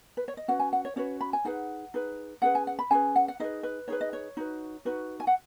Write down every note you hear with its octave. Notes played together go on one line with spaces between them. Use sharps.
B4
C#5
D#5
C#4 F#4 B4 F#5
G#5
F#5
C#5
C#4 F#4 B4 C#5
B5
G#5
D#4 G#4 B4 F#5
D#4 G#4 B4
C#4 G#4 B4 F#5
G#5
F#5
B5
C#4 G#4 B4 G#5
F#5
F#5
D#4 G#4 B4 D#5
B4
D#4 G#4 B4 C#5
D#5
C#5
D#4 F#4 B4
D#4 F#4 B4
G#5
F#5